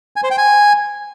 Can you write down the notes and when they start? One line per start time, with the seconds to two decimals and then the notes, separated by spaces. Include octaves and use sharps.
0.16 G#5
0.23 C5
0.31 G5
0.38 G#5